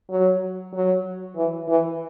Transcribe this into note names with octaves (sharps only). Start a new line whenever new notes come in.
F#3
F#3
E3
E3